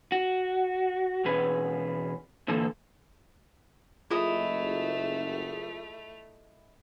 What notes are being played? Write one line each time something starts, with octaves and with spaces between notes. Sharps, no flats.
F#4
E2 B2 C#4 G#4 B4
A#2 D3 E3 A#3 A4
F#1 A3 E4 F4 G#4 D#5 F7